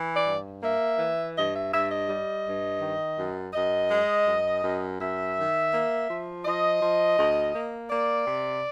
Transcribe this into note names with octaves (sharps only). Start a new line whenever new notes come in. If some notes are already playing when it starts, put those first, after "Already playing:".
Already playing: E3
D5
G2
A#3 E5
E3
G2 D#5
E5
G2 E5
D#5
G3
G2
D#3
F#2
F#2 D#5
G#3
F#2
F#2
F#2 E5
D#3
A#3
F3
F3 D#5
F3
D2
A#3
A#3 D5
C3